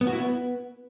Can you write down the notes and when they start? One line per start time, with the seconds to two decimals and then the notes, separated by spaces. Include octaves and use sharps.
0.01 B3
0.07 F#4
0.13 E4
0.19 B3